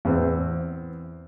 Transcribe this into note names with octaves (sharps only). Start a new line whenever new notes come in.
E2 C4